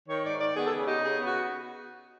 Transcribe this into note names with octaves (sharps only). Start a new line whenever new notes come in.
D#3 C#5
G#2 D5
D#3 D5
B3 G#4
A4
C#3 G#4
D#4 G4
C#3 G#4
B3
F#4